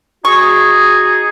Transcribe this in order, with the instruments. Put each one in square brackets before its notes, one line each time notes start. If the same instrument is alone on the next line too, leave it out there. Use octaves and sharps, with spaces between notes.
[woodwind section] D#4 F#4 G#4 [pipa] C#6